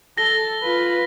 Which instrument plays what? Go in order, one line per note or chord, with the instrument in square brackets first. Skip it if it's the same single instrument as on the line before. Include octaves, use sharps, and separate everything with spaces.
[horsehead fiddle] A4 [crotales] A#6 G7
[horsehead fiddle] F4 B4